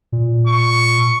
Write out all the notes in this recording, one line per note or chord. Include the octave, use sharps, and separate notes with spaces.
A#2
C#6